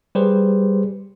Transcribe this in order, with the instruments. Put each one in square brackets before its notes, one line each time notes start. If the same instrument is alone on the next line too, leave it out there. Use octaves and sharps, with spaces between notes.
[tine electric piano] G3 G4 G#4 B4 C5